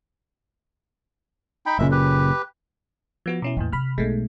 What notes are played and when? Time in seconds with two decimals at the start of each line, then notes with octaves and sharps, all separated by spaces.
1.66 D#4 G5 B5
1.79 F#1 A#2 C#3 G#3 E5
1.91 G4 B4
3.26 F3 B3 F#4
3.42 B2 C#4 E4
3.57 E2 A2 E3 A#3
3.73 C3 B5 F6
3.98 B1 G#3 A3